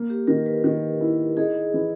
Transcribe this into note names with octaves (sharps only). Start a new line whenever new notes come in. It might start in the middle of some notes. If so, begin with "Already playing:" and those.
Already playing: A#3
G4
D#3 A#4
B4
D#3
E4
D#4 G#4
E3